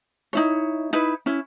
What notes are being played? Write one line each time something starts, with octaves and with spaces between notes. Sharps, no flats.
D#4 E4 C#5
D#4 E4 B4
C#4 E4